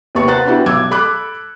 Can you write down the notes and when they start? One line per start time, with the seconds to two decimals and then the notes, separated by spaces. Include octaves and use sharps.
0.15 D#2 C3 B3 A#4 A5 C#6
0.27 B4 C5 F#5 A#5 F#6 A6
0.45 B3 C#4 D4 E4 F#4 G4
0.66 B1 D6 E6 G#6
0.91 A4 B5 D6 F#6